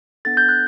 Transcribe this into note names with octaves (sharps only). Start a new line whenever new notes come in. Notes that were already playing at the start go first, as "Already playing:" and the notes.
B3 D4 A4 A6
G6
F#6